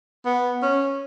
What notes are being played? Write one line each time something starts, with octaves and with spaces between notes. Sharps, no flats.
B3
C#4